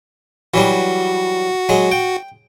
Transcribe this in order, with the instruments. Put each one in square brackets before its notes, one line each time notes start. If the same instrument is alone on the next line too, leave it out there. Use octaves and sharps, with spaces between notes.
[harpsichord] E3 F#3 G3 [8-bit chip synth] F#4
[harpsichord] F#3 G#3
G5